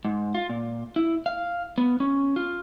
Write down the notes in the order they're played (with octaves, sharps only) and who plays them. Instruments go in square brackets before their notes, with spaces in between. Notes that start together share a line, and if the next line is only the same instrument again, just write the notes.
[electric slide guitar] G#2
F4
A#2
E4
F5
B3
C#4
F4